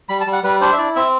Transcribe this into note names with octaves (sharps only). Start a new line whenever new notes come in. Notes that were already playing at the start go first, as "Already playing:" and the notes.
G3 B5
A5
G3
F#5
G3 B4
D4 C5
E5
E4 D5
C4 E5